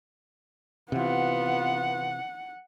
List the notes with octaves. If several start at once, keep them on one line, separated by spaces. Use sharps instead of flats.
C3 E3 B3 F4 F#5